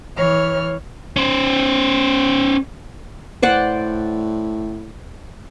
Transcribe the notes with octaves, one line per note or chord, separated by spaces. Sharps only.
E3 C#5 F6
C#4 C5
A2 C5 D5 F#5